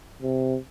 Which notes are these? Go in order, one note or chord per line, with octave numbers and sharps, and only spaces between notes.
C3